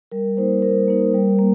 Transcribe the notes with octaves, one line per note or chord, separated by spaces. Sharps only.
G3 A#4
A#3 D#4 C5
G3 A#4
A#3 D#4
G3
A#3